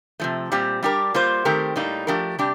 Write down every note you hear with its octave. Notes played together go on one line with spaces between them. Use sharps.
C3 F3 A3
A#2 G3 C4 G4
G3 D4 G4 A#4
G3 A#3 F4 C5
D#3 A3 C4 G4 A#4
A2 G3 A#3 D#4
F3 A3 D4 G4 A#4
C3 G3 D4 G4